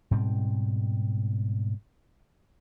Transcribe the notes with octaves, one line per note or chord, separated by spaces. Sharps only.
G#2 B2 G3 C4